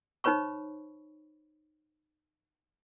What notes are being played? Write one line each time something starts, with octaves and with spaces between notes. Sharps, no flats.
D#4 C5 C#5 B5 C#6